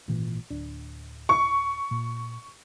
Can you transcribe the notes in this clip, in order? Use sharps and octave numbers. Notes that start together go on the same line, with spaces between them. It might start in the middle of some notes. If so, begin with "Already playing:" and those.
G#1 A#2 E3
D1 D4
C#6
A#2